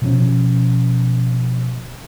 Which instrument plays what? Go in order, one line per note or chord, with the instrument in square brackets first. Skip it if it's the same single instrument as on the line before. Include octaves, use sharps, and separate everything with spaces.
[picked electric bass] B2 F3 C#4